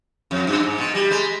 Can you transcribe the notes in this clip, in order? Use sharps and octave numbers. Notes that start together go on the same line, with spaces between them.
F2
G2
G#2
B2
G3
G#3